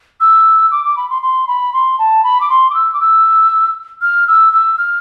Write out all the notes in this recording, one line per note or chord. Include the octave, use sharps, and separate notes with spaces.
E6
D6
D6
B5
C6
C6
B5
C6
A5
B5
D6
C6
D6
E6
D6
E6
F6
E6
E6
F6